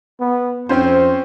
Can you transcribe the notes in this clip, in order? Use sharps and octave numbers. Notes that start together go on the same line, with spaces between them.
B3
F2 C4 C#4 C5